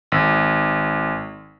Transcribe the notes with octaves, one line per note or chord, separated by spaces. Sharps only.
G#1